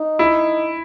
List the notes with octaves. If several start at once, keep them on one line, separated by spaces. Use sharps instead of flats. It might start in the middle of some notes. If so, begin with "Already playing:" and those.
Already playing: D#4
E4